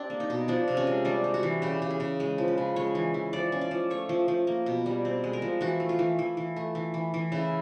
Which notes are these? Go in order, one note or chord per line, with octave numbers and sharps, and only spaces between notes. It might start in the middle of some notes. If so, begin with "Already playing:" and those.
Already playing: C4 D4 G4
A#3
D#4
B2
F3 D4
C3
C#4
G#3
G3 D4
G3
F#4
E3
C#3 G4
C#3
G#4
C#3
G#3
F3
B4
C#3
G#3 C#5
E3
E3
F3 D5
C#4
D5
F3
A3 C#5
F3
F3
A#3
B2
G3
C4
G#3
A#4
F3
E3 F#4
A3
F4
E3
E3
E3
A3
E3
E3
E3
C#3 E4